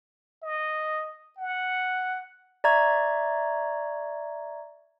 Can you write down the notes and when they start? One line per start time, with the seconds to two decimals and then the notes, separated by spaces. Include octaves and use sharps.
0.43 D#5
1.38 F#5
2.64 D5 E5 A#5 C#6 G#6